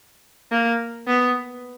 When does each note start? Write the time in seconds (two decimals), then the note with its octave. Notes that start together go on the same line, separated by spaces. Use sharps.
0.51 A#3
1.08 B3